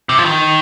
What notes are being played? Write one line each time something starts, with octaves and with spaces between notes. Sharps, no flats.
C3
F3
D#3